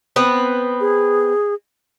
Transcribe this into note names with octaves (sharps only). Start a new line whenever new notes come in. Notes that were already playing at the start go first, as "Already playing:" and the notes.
B3 C4 B4
G#4